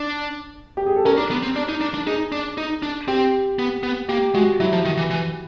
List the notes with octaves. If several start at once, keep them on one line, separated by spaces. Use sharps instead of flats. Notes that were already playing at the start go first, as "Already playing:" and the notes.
Already playing: D4
G4
G#4
A4
C#4 A#4
D4
B3
C4
D4
D#4
D4
D4
D#4 G#4
D4
D#4
D4
C4 G4
B3
B3
A#3 G4
G#3 F#4
F#3 E4
F3
D#3
E3
E3